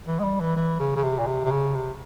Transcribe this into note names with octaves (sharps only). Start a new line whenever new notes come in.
E3
G#3
G3
E3
E3
C#3
C#3
C3
A#2
C3
C3
C#3
C3